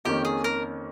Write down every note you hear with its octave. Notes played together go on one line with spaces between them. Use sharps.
F2 D#3 A#3 C#4 G4
G#4
A#4